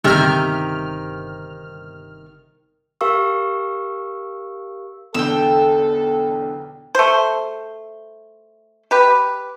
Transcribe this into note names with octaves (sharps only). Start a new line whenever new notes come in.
G1 C3 D#3 G4 F6
G4 A#4 F5 C#6 E6
B1 E2 D3 A4 G5 E6
A3 C5
G4 B4